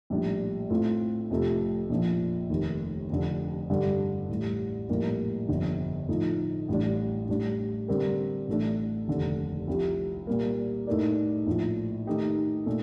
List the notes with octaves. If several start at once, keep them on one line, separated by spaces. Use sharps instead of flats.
A#1 A2 G3 D4
A2 A3 C4 F4
F1 F2 C3 F3 A3
A#1 A#2 F3
F1 D#2 D#3
F1 F2 D3
G2 D3 G3
A1 A2 G3
A#1 A2 G3 A#3
G1 F2 D3
A2 F3 A3 D#4
A1 A2 G3 D4
A2 G3 D4
D3 G3 C4 G4 A#4
A1 A2 A3 D4
F1 D#2 D3
C2 C3 F3
A#2 G3 A#3
A2 A3 D#4 A#4 D5
A#1 A2 F3
D#3 A3 D#4 G4
A#2 A3